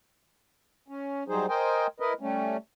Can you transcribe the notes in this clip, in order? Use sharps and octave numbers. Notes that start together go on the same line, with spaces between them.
C#4
F#3 G3 D#4 G#4 C5
A#4 C5 D#5 G5 G#5
E4 A#4 B4 D#5
G3 A3 C#4